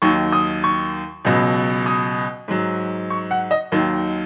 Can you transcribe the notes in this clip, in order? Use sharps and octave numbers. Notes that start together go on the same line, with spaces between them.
D#2 D#3 F#3 C#6
D#6
C#6
C#2 B2 F#3
D#6
G#2 F#3
C#6
F#5
D#5
D#2 D#3 F#3